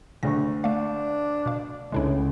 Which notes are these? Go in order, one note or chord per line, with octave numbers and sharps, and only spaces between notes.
D2 A#2 C#3 C#6 A#6
A3 D4 F5
B2 F5
C#2 A2 C#3 G#3 D4 E4